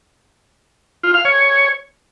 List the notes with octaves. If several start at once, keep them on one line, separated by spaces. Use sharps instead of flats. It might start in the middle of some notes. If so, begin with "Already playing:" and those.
F4
F5
C#5